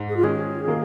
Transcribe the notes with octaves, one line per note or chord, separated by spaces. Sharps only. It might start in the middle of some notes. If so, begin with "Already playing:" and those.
Already playing: G#2
G#4
F4
D#3 G#3 C#4 G#4
D#3 A#3 F4